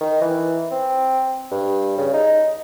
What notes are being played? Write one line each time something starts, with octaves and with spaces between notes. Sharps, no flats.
D#3
E3
C4
G2
C#3
D#4